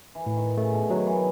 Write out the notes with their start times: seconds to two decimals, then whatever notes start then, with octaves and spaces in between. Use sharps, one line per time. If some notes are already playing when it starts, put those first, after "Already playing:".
0.15 E3
0.26 A2
0.36 D#3
0.57 C#3 A3
0.74 B2
0.90 D#3 F#3
1.07 E3